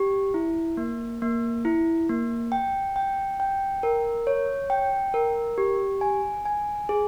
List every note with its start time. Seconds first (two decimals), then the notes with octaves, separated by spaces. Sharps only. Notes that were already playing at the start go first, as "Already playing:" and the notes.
Already playing: G4
0.34 E4
0.77 A#3
1.22 A#3
1.65 E4
2.09 A#3
2.52 G5
2.96 G5
3.40 G5
3.83 A#4
4.27 C#5
4.70 G5
5.14 A#4
5.58 G4
6.01 G#5
6.45 G#5
6.89 G#4